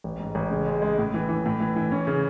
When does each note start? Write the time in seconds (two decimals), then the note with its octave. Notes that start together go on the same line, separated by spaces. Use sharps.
0.04 A1
0.20 G#2
0.35 A1
0.51 C#3
0.67 G#3
0.82 G#3
0.98 A2
1.14 E3
1.29 E3
1.46 A2
1.60 E3
1.76 E3
1.91 C#4
2.07 C#3